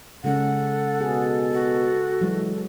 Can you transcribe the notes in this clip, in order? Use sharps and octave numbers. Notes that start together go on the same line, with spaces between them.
C#3 G#3 C#4 A4 F#5
B2 G#4
F#4
E3 F#3 G#3